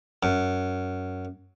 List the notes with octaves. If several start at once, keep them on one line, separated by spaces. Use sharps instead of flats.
F#2